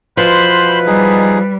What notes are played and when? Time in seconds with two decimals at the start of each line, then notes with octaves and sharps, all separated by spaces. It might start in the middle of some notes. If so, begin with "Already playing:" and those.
0.17 B2 E3 F3 B4 C5 B5 C6
0.87 G3 D#4 G#4